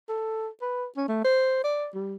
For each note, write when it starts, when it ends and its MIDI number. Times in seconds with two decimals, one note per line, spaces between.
0.09 0.48 69
0.62 0.86 71
0.97 1.05 61
1.08 1.23 57
1.24 1.59 72
1.64 1.88 74
1.94 2.16 55